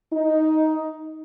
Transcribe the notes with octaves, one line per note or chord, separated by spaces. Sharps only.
D#4